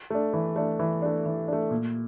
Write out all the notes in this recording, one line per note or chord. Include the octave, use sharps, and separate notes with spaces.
A3 D4
E3
A3 D4
E3
A3 D4
E3
A3 D4
A#2